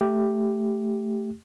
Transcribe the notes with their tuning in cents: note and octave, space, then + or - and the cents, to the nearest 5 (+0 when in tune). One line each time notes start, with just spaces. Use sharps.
A3 +0 G4 +0